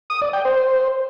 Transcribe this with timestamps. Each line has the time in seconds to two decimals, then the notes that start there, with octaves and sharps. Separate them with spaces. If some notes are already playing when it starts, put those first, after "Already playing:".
0.10 D#6
0.22 D5
0.33 G5
0.45 C5